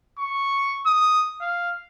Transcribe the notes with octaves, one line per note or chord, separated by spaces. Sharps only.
C#6
D#6
F5